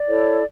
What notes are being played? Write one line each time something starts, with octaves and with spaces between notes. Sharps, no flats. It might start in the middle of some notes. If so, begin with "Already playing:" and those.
Already playing: D5
E4 A4 C#5